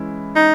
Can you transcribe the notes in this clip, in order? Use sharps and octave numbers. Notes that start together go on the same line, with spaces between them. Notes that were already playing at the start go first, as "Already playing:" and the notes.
Already playing: E3 G#3 C#4 E4
D#4